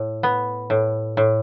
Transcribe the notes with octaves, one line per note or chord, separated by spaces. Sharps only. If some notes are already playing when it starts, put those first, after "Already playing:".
Already playing: A2
B3
A2
A2